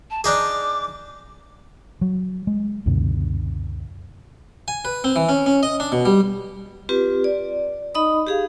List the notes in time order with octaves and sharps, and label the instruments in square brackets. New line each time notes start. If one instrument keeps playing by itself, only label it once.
[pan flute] A5
[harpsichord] D4 D#4 G#4 [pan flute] D6
[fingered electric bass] F#3
G#3
C#2 F#2 B2 D3
[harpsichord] G#5
B4
C4
E3
C#4
C#4
D#5
D4
B2
G3
[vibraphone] C4 F4 G4 B4
D5
D#4 D#5 B5 D#6
G4 G#4 F5